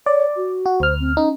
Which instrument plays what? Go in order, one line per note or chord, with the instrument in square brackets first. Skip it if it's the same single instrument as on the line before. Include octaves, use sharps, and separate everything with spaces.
[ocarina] C#5 [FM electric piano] D5
[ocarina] F#4
[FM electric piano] F#4
[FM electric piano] D2 F6 [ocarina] C5
[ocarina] C4
[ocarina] C#4 [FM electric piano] D#4